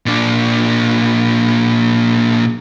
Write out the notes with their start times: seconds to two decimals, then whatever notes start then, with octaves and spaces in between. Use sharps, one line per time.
0.06 A#2 D4